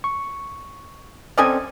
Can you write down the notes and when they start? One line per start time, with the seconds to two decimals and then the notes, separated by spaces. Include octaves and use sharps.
0.04 C#6
1.38 C4 C#4 A4 D5 D#5 G#5